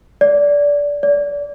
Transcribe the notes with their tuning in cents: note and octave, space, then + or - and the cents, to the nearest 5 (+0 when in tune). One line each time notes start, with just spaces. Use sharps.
D5 -20
D5 -30